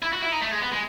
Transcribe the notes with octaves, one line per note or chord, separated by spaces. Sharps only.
E4
F#4
E4
D#4
A3
G#3
B3
G#3